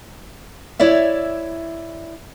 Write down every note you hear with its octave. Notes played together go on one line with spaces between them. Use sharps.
E4 C#5 D5 E5